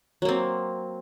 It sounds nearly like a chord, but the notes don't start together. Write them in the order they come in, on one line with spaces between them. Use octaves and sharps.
F#3 A#3 C4